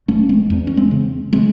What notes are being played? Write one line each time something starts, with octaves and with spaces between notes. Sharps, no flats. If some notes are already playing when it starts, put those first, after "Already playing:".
E1 A3 C#4
G#3 C4
E2
C#4
G#3 C4
C#3
G#3 C4